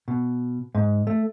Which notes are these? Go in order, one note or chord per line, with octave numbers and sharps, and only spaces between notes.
B2
G#2
A3